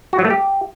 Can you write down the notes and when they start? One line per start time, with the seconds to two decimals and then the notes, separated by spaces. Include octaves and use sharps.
0.13 F#4
0.19 F#3
0.25 A3
0.30 G4